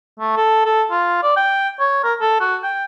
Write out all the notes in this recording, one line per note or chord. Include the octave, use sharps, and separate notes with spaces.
A3
A4
A4
F4
D5
G5
C#5
A#4
A4
F#4
G5